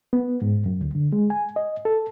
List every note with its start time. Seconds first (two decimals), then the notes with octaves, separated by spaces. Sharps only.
0.13 B3
0.42 G#2
0.66 F#2
0.81 D2
0.95 D3
1.12 G#3
1.30 G#5
1.56 D#5
1.85 A4